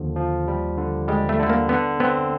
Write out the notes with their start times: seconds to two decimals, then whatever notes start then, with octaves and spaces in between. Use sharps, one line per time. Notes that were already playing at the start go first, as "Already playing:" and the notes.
Already playing: D#2 D3 F3
0.16 F3
0.48 G3
0.77 D3
1.08 G3 G#3
1.29 A3
1.39 D3 A3
1.50 A#3
1.69 D3 B3
2.00 B3 C4